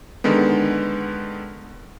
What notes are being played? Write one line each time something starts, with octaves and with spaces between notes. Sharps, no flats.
D3 D#3 G#3 B3